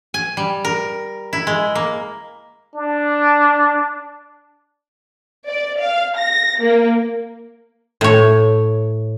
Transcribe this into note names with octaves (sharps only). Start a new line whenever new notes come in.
G#5
G3
A#4
E4
G#3
A#3
D4
D5
F5
A#6
A#3
A2 C#5